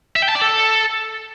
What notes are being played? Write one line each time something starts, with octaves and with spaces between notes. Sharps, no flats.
E5
G5
A5
D5
A4